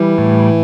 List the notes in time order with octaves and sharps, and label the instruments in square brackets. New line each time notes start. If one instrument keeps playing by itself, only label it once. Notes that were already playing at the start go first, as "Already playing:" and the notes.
Already playing: [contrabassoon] E3 [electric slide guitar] G3
[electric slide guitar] A2